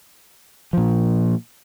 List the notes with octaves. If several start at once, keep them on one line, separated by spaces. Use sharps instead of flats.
A#2 F3